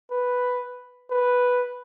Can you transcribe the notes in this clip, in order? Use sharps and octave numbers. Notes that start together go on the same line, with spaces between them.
B4
B4